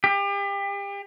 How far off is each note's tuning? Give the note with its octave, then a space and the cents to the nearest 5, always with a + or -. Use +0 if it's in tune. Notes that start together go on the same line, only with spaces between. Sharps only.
G4 +35